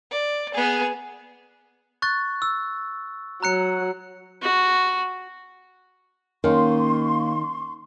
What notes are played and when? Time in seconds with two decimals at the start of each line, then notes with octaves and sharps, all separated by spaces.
0.11 D5
0.54 B3 G#4
2.02 C#6 F#6 A6
2.42 E6
3.43 F#3 A#5 F#6 C#7
4.42 F#4
6.44 D#3 A#3 C#4 D#4 F5 C6 C#6